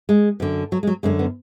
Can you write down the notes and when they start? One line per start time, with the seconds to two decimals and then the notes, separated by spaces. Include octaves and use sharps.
0.09 G#3
0.40 F#2 D3
0.72 F#3
0.83 G#3
0.87 F#3
1.03 F#2 D3 G#3
1.19 B3